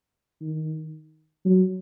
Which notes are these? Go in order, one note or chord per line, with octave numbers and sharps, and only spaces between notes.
D#3
F#3